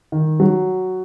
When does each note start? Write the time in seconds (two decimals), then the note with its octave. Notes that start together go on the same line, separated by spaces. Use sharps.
0.12 D#3
0.40 F#3